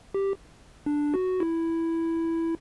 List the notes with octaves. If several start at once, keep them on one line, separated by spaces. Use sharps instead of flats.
G4
D4
F#4
E4